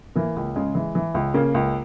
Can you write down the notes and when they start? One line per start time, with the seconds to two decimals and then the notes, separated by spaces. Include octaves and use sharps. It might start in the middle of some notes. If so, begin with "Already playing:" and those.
0.15 E3 A#3
0.36 C#2
0.56 C#3 G#3
0.75 E3
0.95 E3
1.15 C#2
1.34 C#3 A#3
1.54 C#2